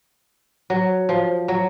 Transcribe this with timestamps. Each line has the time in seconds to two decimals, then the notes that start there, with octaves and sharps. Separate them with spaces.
0.70 F#3
1.09 F3
1.48 F#3